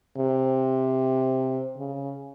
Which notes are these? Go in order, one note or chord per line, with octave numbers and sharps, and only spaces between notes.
C3
C#3